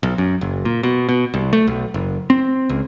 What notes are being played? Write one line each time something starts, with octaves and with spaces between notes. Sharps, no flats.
B1
F#2
F#1
A#2
B2
B2
C2
A3
B1
F#1
C4
C#2